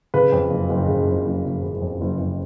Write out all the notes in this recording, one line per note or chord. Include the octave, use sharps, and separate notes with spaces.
C#3 B4
F2
F#1
F#1
C#3
F2
F#1
F#1
C#3
F2
F#1
F#1